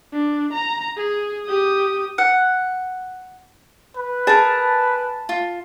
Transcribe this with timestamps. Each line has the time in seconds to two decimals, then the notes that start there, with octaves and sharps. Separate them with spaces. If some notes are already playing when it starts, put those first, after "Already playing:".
0.13 D4
0.53 A#5
0.97 G#4
1.46 G4 D#6
2.18 F#5
3.96 B4
4.27 G#4 A#4 A5
5.29 F4